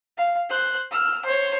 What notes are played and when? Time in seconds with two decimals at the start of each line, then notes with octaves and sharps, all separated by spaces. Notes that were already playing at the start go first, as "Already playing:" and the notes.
0.17 F5
0.49 C5 F#6
0.91 E6 F6
1.25 C5 C#5